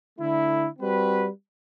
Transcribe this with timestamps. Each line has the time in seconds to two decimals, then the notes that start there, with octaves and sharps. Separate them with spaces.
0.18 D3 A3 E4
0.79 G3 C4 F#4 B4